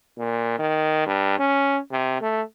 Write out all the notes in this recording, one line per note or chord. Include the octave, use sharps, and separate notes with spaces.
A#2
D#3
G2
C#4
C3
A3